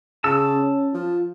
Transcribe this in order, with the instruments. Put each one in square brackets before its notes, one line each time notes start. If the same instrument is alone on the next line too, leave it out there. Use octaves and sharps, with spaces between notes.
[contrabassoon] C#3 [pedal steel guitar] A5 E6
[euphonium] C#4
[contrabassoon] F3 [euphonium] F4